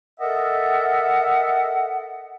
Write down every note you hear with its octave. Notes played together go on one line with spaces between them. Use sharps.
A4 A#4 D#5 E5 F#5